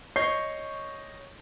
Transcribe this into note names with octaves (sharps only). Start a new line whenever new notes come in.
C#5 D#5 C#6 G6 C7